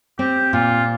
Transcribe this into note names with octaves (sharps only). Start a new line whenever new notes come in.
C4 G4
A#2 F4